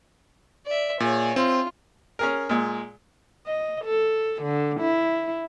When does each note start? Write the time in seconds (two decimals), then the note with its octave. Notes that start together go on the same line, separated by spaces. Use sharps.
0.66 D5 E5
1.00 A#2 G#4 C#5
1.36 C4 F4
2.19 C#4 G#4 A#4
2.49 A#2 G#3
3.46 D#5
3.84 A4
4.42 D3
4.80 E4